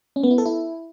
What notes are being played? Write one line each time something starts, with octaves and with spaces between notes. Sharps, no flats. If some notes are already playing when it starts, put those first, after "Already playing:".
C#4
B3
E4
A4
E4